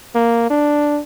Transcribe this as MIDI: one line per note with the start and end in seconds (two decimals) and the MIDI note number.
0.15 0.47 58
0.50 1.01 62